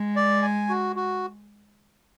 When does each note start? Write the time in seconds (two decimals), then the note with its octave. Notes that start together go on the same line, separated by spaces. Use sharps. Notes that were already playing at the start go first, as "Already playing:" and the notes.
Already playing: G#3
0.16 D5
0.42 G#5
0.69 F#4
0.96 F#4